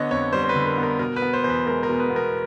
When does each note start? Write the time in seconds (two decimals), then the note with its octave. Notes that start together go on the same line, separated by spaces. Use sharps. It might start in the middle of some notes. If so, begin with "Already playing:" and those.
Already playing: D3 B3 C#5 D#5
0.11 F2 C#5
0.33 G3 C5
0.44 C5
0.49 B4
0.55 D3
0.66 A#4
0.78 B3
0.83 A#4
0.99 B2 A#4
1.16 B4
1.22 B3
1.33 C5
1.44 E2 C5
1.50 B4
1.66 G#3 A#4
1.83 A#4
1.89 B2
2.00 B4
2.10 B3
2.16 A#4